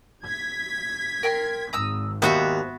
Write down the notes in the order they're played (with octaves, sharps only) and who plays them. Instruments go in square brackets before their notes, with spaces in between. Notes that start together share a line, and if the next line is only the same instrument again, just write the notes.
[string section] G#6 B6
[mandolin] A#4 G5 C6
[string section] G#1 [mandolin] A#5 D#6 E6
[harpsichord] D#2 [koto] B3 F#4 E5 [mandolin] C5